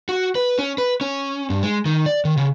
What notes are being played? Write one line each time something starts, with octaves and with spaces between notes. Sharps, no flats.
F#4
B4
C#4
B4
C#4
G2
G#3
D#3
D5
D#3
C#3